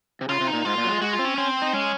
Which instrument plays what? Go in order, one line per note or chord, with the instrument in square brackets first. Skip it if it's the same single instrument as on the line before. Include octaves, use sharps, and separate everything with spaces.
[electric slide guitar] C3
[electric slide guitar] C#3 [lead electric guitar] F4
[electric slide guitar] C3
[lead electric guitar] D#4
[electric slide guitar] A#2
[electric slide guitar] G#2 [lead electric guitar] F4
[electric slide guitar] A#2
F#3
G#3
[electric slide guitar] G#3 [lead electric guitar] F#4
[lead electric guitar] F4
[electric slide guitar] C4
[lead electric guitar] C#4
[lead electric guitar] C4 [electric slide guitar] C#4
[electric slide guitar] D#4
[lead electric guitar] G#3 [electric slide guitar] C#4